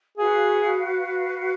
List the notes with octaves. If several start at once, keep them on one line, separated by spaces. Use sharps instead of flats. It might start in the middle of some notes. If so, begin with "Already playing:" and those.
F#4 G#4 B4 F5